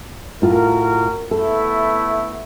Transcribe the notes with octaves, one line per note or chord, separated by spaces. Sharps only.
A2 F4 F#4 A#4
A3 B3 E4 A4